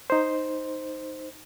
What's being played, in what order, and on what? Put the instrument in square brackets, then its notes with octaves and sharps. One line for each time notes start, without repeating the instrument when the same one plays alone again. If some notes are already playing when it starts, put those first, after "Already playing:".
[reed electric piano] D#4 C5